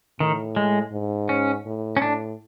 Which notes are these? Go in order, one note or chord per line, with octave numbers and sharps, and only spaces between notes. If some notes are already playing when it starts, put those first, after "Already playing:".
A2 D#3
G#3
G#2
C#4
A2
C#4
A2 D4